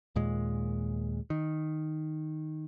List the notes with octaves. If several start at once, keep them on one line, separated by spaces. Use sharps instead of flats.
D#2 A#2 G#3
D#3